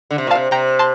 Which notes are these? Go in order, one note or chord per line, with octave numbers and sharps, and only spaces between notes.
D3
C3
A#2
C3 F5 A5
C3 G5 A#5
A5 C6